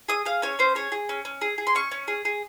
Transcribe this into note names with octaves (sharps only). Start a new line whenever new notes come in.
G#4 D#6
G#4 F5
C#4 C#5
C#4 C5
G#4 C#5
G#4
C#4
C#4
G#4
G#4
C6
C#4 C#6
C#4
G#4
G#4